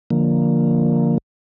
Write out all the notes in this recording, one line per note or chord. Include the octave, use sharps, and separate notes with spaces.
D3 F3 A#3